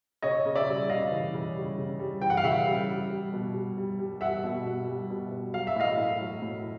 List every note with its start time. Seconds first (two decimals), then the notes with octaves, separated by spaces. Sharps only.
0.22 C#3 C#5 D#5
0.46 C#3
0.55 D5 E5
0.68 G3
0.89 C#3 D#5 F5
1.11 E3
1.34 C#3
1.56 G3
1.78 C#3
1.99 G3
2.21 E3 G5
2.30 F#5
2.37 F5
2.44 C#3 E5 F#5
2.67 G3
2.88 G3
3.10 G3
3.33 B2
3.54 G3
3.77 G3
3.99 G3
4.21 G3 E5 F#5
4.44 B2
4.66 B2
4.87 G3
5.10 B2
5.32 B2
5.54 F#3 F5
5.67 E5
5.76 A2 D#5 F5
5.98 A2
6.21 F#3
6.42 A2